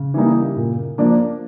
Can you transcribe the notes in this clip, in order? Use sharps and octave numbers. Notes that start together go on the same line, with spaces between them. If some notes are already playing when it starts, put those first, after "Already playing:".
Already playing: C#3
E3 G3 A#3 D#4
A#2
F3 A#3 D4